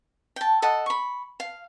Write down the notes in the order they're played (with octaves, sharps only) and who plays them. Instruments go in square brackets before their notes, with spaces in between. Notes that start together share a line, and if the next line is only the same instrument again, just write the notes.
[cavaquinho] G5 A5
A4 D#5 F#5
B5 C#6
F5